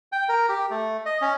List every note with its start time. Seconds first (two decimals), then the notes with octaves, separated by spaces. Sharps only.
0.12 G5
0.29 A#4
0.49 G4
0.70 A3
1.06 D#5
1.22 C#4